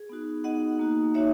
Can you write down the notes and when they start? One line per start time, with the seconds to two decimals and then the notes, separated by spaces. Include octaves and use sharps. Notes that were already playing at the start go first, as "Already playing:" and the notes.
Already playing: G#4
0.09 B3 D#4 F#4
0.44 B3 D#4 F#4 D#5 F#5
0.79 A#3 D#4 F#4
1.14 A#3 D#4 F#4 C#5 E5